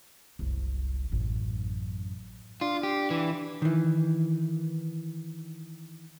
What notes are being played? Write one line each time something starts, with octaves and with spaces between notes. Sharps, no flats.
F#1 C2
A1 F#2
D4 F4
G4
E3
D#3 E3